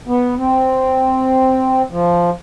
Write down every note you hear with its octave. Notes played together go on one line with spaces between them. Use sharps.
B3
C4
F3